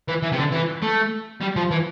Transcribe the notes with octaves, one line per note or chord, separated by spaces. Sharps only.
E3
E3
C3
D3
E3
A3
G3
F3
E3